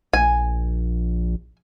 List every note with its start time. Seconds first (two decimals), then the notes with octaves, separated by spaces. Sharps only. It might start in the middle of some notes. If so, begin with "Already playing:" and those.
0.13 A#1 G#5